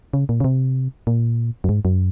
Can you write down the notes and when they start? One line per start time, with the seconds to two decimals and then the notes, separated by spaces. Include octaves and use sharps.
0.14 C#3
0.29 A#2
0.40 C#3
0.44 C3
1.07 A#2
1.64 F#2
1.69 G#2
1.85 F#2